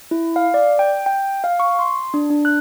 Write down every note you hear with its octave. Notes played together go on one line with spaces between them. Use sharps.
E4
F5
D5
G5
G5
F5
C#6
C6
D4
D4
F#6